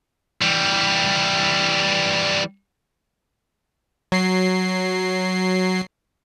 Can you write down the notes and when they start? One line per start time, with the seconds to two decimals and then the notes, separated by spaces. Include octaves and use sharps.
0.42 E3 G3
4.12 F#3 C7